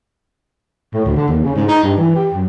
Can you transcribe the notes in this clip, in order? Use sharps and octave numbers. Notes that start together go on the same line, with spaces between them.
A2
D2
D3
D#2
C#3
G#2
D#4
G2
E3
G4
F#2